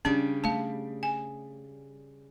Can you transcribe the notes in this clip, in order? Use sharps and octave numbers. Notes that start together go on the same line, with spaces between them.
C#3 G3 C#4 D4
A3 F5 A5
G#5